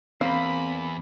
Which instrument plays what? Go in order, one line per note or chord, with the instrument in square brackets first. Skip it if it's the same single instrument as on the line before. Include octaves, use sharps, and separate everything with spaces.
[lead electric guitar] E2 [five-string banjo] A#3 [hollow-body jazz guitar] C4 C5 [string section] B5